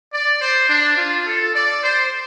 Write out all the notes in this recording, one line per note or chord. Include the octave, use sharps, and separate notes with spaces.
D5
C5
D4
F4
A4
D5
C5